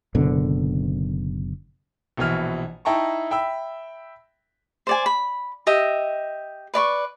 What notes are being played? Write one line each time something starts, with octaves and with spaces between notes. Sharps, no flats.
F#1 B2 D3
A#1 B2 E3 F6
D#4 E4 G5 A5 A#5 C#6
E5 G5 B5 E6
C5 D5 G#5
B5
G4 D#5 E5
B4 D5 B5 C#6